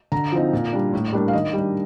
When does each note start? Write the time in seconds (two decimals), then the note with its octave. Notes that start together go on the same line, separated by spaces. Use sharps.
0.12 D3 A#5
0.32 F3 C4 D#4
0.53 A#2
0.73 G3 D4
0.93 A2
1.13 G3 A#3 D4
1.28 F5
1.33 D#3 D#5
1.53 G3
1.58 D4